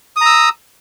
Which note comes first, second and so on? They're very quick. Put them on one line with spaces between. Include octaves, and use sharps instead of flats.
D#6 A#5 E6